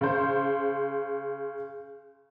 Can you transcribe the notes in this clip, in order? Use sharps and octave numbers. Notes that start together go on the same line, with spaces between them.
C#3 C5